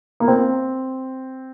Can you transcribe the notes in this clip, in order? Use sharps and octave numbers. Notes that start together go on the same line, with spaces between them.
A#3
C4